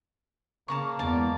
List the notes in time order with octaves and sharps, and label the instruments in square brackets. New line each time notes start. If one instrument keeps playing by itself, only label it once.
[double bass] C#3 [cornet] A#3 [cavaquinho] A5 A#5 C#6
[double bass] E2 G#3 [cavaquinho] D5 A5